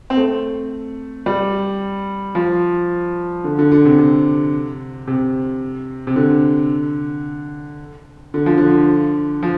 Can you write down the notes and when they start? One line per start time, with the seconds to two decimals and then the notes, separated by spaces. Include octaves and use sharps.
0.10 C4
0.17 A3
1.26 G3
2.35 F3
3.44 D3
3.59 D3
3.72 D3
3.85 C3
3.98 C3
5.07 C3
6.07 C3
6.16 D3
8.34 D3
8.46 F3
8.57 D3
9.43 F3